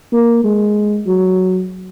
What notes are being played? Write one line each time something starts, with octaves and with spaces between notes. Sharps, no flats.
A#3
G#3
F#3